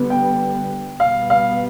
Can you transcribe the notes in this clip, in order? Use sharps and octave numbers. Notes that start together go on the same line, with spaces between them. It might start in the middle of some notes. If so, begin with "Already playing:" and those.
Already playing: D3 G3 B3
G5
B2 G3 B3 F5
F5